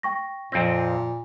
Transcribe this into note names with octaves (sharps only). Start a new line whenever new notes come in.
G5 C#6 A#6
F2 A#2 C4 A#6